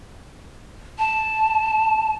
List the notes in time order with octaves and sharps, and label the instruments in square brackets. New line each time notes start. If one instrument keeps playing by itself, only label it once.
[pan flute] A5